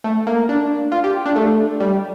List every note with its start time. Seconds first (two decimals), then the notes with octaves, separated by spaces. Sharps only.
0.04 A3
0.27 A#3
0.49 D4
0.92 F4
1.04 G4
1.26 D4
1.36 A3
1.80 G3